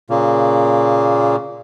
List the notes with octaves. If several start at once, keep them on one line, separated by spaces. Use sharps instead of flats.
A#2 C#3 A#3